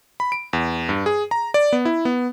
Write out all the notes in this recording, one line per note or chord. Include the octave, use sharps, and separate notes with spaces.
B5
D7
E2
G2
G#4
A#5
D5
B3
E4
B3